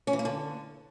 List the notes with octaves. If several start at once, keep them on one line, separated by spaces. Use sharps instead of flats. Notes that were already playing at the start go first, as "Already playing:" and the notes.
C#4
E3
A#3
D3